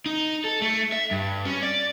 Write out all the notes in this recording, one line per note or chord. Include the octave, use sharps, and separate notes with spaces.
D#4
A4
A3
E5
G2
C#4
D5